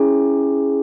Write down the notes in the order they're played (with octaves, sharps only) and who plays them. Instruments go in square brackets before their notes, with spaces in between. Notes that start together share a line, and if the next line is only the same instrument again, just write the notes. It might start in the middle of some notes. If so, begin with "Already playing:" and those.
Already playing: [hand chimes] C#4 E4 G#4